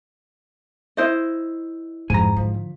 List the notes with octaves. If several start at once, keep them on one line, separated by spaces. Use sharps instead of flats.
E4 C5 D#5
F2 G#2 G#5 A#5
D3 F3